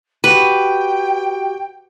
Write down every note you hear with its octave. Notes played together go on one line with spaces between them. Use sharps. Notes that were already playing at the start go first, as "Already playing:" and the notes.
F#4 G4 B4 G5